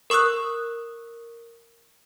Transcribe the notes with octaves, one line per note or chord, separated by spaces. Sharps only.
A#4 C#6 D#6 E6 F#6